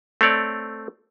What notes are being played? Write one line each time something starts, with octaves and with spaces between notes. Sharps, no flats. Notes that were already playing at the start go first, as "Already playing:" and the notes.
A3 C4 C#5 D5